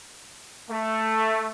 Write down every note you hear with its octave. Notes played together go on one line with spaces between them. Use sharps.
A3